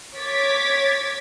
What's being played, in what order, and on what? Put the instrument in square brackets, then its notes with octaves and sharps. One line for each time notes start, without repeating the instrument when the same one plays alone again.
[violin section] C#5 D6 G#6 A6 B6